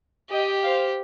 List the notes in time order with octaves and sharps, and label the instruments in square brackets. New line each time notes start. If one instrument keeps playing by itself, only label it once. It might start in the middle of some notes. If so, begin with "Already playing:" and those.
[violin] G4 [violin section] D#5 G5
[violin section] C5 F5